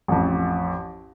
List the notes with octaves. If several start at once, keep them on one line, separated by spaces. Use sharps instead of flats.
A1 F2